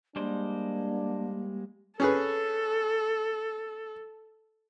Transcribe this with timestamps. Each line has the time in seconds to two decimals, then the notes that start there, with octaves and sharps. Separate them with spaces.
0.16 G3 G#3 A#3 D4 C5
2.00 C#4 G#4 A4 B4